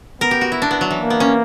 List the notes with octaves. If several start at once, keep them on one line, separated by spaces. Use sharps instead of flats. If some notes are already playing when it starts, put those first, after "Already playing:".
B3 A#4
G4
F#4
E4
D4
B3
F#3
E3
A#3
B3
C#4